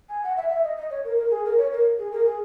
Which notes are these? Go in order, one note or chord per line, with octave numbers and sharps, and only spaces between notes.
G#5
F#5
E5
E5
D#5
D#5
C#5
A#4
A#4
G#4
A#4
C#5
A#4
G#4
A#4
G#4